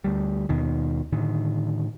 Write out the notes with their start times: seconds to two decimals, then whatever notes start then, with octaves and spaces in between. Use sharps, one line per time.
0.04 D2 G3
0.49 D#2 B2 D#3
1.12 A2 D3 D#3